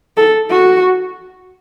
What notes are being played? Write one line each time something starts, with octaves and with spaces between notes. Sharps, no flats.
A4
F#4